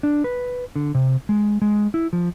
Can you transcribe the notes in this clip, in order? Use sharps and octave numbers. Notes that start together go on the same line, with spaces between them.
D4
B4
D3
C3
G#3
G#3
E4
F3